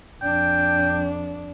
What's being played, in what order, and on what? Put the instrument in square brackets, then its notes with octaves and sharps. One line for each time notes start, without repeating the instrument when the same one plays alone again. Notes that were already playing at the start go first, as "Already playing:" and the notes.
[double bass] F2 D4 [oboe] G5